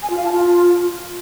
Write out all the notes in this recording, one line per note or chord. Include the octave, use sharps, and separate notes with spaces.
G#5
F4
F5
A5
F4